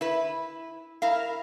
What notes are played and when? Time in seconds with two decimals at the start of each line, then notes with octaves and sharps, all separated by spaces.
0.01 E4 B4
1.02 E4 A#4 F5